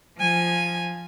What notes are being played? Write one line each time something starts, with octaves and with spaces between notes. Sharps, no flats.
F3 G#5